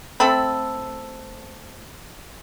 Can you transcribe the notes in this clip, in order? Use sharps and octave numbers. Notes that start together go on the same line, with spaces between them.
A3 C4 A4 B5